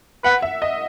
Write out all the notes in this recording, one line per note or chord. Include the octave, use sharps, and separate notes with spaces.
B4 F#5
E5
D#5